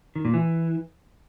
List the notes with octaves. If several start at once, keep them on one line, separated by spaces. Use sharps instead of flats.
D#3
A#2
E3